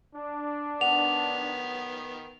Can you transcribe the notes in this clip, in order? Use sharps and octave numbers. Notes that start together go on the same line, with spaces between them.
D4
D#3 B3 F#5 F7